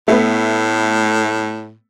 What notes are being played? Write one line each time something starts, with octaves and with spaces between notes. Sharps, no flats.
A2 A3 B3